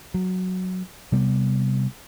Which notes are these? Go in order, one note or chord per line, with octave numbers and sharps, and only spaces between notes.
F#3
C3 G3 B3